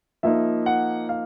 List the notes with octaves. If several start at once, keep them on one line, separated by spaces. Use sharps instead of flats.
F3 A#3 D#4 E5
F#5
F5